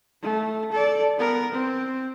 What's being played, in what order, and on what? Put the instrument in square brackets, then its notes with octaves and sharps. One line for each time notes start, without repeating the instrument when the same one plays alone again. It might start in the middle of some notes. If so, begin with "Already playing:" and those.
[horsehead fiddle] A3
A4 D5
B3 A#4
C4